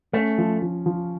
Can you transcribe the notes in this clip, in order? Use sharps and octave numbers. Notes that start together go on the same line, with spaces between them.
A3 C#4
F3
F3
F3